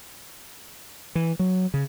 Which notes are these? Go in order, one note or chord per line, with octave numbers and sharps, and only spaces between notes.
E3
F#3
C#3